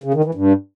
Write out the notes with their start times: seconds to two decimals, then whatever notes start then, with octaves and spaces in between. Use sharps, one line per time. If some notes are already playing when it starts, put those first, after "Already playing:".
0.04 C#3
0.14 D#3
0.24 E3
0.35 G2